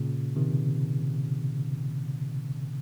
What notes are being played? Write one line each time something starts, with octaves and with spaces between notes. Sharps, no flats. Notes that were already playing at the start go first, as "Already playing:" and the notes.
Already playing: A#2 C#3
C3 D#3